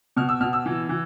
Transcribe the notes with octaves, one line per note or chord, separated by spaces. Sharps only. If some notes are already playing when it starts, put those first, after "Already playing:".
B2 F6
E6
B2 F6
E6
E3
E3